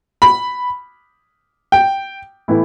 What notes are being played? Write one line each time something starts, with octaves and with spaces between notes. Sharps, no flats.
B5
G5
A2 E3 B3 E4